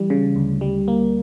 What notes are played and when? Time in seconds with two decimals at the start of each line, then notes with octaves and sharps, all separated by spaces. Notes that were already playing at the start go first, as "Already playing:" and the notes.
Already playing: E3 G3
0.10 C#3
0.36 D2
0.61 G3
0.88 A#3